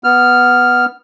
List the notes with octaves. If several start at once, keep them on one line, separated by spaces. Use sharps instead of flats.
B3 F6